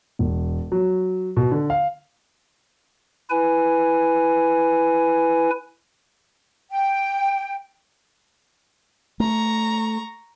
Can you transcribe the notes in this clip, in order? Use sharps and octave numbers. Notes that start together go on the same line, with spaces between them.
E1
F#3
B2
D3
F5
E4 B4 G#5
G5
A3 A#5 C#6